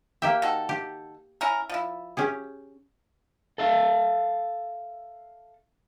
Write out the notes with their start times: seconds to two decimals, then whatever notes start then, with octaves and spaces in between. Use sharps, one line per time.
0.22 A#3 G4 E5 G5
0.42 D#3 F#4 A4
0.69 G4
1.41 C#4 E4 A#4
1.69 F3 E4
2.17 C#4 G4 G#4
3.58 A4 E5 F5